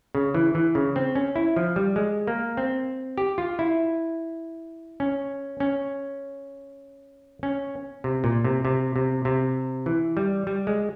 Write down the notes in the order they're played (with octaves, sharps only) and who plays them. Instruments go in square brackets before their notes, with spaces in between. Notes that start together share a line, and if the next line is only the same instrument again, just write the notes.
[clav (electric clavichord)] C#3
E3
E3
C#3
C4
C#4
E4
F3
G3
G#3
A#3
C4
G4
F4
E4
C#4
C#4
C#4
C3
A#2
C3
C3
C3
C3
E3
G3
G3
G#3